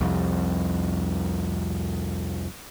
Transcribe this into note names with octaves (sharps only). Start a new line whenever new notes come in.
C2 F2 C3